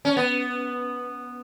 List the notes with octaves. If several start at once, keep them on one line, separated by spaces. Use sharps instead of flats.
C#4
B3